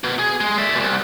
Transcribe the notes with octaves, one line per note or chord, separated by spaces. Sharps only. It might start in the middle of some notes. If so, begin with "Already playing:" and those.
B2
G#4
G#3
D5 E5
C2 B2